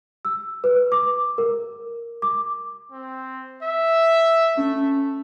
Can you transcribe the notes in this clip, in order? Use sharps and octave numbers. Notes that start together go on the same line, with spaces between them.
E6
B4
D6
A#4
D6
C4
E5
A3 C#4